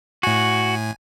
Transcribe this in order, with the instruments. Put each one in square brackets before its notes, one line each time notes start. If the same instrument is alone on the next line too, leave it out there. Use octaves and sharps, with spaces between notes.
[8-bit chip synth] A2 G#5 [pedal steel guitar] F#4